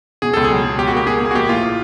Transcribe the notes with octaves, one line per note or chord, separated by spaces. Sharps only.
B2 G#4
C#2 A4
G#4
F#3
B2
C#2 G4
F#4
A#3 G4
B2 G#4
A#3 G#4
F#4
A#1 G4
A2 F4